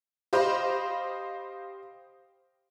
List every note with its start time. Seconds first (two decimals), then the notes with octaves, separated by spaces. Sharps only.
0.33 G4 C5 D#5 F5 B5